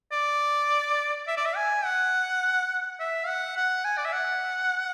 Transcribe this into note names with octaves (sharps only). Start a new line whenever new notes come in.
D5
E5
D5
E5
G#5
F#5
E5
F#5
F#5
G#5
D5
E5
F#5